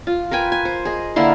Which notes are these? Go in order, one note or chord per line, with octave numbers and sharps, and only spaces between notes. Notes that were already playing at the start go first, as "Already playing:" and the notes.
F4
A#4 B4 G5 G#5
G#5
C5
G#4 D#5
D3 A#3 E4 C6